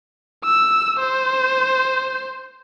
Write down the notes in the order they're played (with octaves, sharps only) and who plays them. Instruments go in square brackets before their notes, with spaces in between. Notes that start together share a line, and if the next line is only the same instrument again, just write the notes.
[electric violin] E6
C5